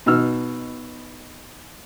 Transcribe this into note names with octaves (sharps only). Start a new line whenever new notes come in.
B2 D#4 E6 F6